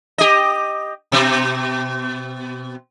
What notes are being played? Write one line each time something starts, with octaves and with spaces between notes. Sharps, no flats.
G4 D#5
B2 C4